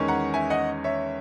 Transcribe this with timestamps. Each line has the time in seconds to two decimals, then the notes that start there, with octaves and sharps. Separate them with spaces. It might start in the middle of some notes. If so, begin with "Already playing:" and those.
Already playing: E2 D#3 G#3 C#4
0.08 F#5 A#5
0.34 E5 G#5
0.50 D#5 F#5
0.84 C#5 E5